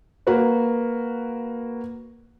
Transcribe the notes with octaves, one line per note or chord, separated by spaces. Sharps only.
A#3 F#4 B4